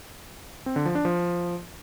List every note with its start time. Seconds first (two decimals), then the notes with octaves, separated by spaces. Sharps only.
0.66 C4
0.76 D3
0.86 F3
0.95 D4
1.05 F3